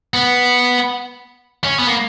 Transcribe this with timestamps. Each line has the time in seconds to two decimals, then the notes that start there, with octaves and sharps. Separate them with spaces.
0.14 B3
1.64 C#4
1.79 B3
1.87 A#3